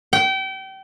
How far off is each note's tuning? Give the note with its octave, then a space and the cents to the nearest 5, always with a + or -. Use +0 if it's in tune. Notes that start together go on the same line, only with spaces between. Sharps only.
G5 -30